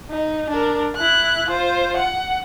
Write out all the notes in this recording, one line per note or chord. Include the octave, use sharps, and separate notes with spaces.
D#4
D4 A#4
E4 F#6
F4 C5
F#5